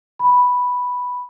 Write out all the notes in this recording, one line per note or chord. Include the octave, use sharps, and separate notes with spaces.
B5